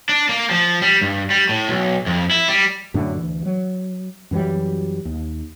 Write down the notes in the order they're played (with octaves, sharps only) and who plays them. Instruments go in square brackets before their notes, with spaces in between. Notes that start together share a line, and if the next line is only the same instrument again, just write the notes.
[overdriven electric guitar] D4
A#3
F3
G3
G2
G3
A2
B1
F2
E4
G3
[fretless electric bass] F#2 A2 D3 D4
D2 E3
F#3
F#2 E3 F#3 G3
D#2